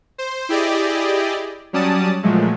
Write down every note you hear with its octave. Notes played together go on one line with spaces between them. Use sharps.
C5
E4 G4 G#4 D5 D#5
F#3 G3 C#4 D5 A5 D#6
A#2 F3 F#3 G#3 A3